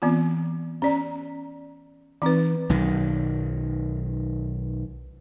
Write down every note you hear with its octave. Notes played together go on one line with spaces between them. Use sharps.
E3 B3 C4 F4
C#4 D5 A#5
E3 C4 D#4 B4
B1 D#3